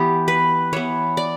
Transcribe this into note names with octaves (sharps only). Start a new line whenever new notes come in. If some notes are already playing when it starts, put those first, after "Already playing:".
Already playing: E3 B3 G4
B4
E3 B3 C#5
D5